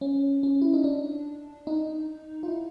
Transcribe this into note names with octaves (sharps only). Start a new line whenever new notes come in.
C#4
C#4
E4
D#4
D4
D#4
F4
E4